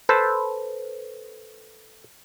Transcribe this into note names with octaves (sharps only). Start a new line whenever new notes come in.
A4 B4 C5